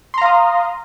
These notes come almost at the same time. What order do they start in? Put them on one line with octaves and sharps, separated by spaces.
C6 A#5 F5 D#6